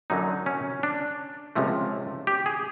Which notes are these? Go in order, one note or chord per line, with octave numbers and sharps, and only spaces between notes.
F#2 D3 F#3 D#4
C#4
D4
C#2 C3 F3 A3
G4
G#4